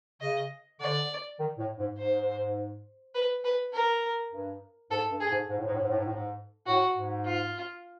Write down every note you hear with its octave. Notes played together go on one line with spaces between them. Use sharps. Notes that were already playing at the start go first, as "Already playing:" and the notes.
C#3 D#5
D3 D5
D#3
A2
G#2
G#2 C5
B4
B4
A#4
G2
G#2 A4
G2
G#4
G#2
G#2
A2
G#2
A2
G#2
A2
G#2
A2
G#2
A2 F#4
G#2
F4